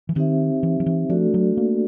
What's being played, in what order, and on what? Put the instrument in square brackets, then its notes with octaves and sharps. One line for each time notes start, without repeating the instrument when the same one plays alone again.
[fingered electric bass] E3
[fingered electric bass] D#3 [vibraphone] C4 D#4 G4 C5 E5
[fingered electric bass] E3
F3
E3
[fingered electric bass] F3 [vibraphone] A3 D4 F#4 A4 D5
[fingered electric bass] F#3
A#3